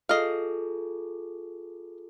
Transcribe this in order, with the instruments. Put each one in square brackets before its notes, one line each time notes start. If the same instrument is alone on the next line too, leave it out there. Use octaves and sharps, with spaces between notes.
[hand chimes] F4 G#4 A4 [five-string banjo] D#5 F5